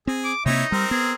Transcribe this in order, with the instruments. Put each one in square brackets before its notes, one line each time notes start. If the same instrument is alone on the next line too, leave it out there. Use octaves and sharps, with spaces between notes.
[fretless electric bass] C4 [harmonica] G#4
[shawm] D6
[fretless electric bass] C3 A#3 C4 [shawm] D#4 [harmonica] E4 C#5 D#5
[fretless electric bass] G3 [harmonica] C4 A#4
[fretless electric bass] B3 [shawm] G#4